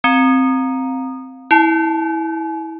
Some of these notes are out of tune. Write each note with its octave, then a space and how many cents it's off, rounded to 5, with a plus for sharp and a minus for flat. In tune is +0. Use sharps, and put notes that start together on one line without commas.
C4 +0 A#5 +0
E4 -20 G#5 +45